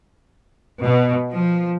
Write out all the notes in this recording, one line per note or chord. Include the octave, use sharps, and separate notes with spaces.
B2
F3